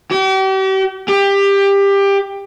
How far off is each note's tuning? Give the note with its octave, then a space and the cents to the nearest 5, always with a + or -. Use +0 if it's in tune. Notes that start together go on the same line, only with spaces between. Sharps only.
G4 -40
G4 +20